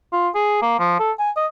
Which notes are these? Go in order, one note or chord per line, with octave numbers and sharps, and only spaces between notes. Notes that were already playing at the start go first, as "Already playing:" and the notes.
F4
G#4
A#3
F3
A4
G#5
D#5